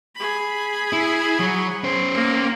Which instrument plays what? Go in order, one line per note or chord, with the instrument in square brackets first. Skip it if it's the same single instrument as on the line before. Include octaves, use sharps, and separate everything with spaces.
[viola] G#4 B5
[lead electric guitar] E4
F#3
C#4 C5
[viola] A#3